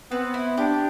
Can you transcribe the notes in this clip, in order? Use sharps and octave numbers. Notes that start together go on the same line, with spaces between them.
B3 C4
E4
D4 G4